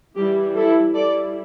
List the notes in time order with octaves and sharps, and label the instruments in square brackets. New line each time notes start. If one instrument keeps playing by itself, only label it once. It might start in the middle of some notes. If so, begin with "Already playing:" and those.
[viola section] E3 G3 E4 G4
E4 A4
G3 E4 A4 D5